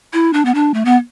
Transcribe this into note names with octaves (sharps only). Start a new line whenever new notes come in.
E4
D4
B3
D4
A3
B3